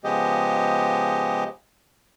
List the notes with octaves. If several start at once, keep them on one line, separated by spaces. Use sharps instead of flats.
C#3 F3 G#3 B3 G4 D#5